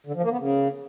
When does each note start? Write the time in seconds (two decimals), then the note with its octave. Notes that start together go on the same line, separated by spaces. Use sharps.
0.07 D3
0.15 F3
0.23 A#3
0.31 B3
0.39 C#3